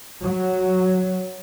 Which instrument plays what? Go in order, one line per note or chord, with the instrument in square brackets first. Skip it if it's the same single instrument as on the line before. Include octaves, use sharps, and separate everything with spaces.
[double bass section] F#3